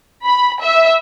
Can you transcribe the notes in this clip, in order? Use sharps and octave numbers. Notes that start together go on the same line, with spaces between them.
B5
E5